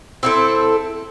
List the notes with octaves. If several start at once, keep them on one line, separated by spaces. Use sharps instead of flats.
C4 E4 A4